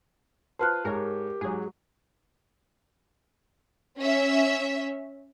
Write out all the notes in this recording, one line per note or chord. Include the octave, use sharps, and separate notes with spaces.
F4 B4 C5 A5 F6 F#6
G#2 G4 A#4 C#5
G#2 F#3 G#4
C#4 E5